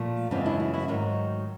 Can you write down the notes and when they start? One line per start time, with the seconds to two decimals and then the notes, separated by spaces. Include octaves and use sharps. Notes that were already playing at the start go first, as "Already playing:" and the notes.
Already playing: A#2 F3 A3
0.31 F#2 C#3 E3 G#3 B3 C4 D4
0.46 D4 E4
0.60 E4 F#4
0.74 E4 F#4
0.88 G#2 D#3 F#3 A3